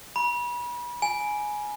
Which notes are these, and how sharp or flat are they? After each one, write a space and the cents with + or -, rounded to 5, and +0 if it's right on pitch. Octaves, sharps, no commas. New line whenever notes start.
B5 -35
G#5 +10